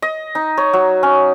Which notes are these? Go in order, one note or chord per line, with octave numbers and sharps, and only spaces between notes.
D#5
D#4
C#5
F#3
C#4